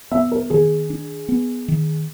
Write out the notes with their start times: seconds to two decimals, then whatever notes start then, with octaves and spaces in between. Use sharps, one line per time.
0.11 B3 E5
0.32 A#4
0.50 D#3 G#4
0.90 D4
1.29 B3
1.68 D#3